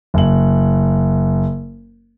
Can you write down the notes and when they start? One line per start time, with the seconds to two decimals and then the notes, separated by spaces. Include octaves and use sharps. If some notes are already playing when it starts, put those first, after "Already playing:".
0.14 F#1 F#7